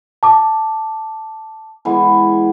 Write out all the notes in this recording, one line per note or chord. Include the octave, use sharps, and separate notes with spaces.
A5 D6
E3 G#3 B3